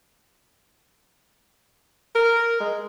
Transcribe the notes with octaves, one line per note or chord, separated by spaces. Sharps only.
A#4
G#3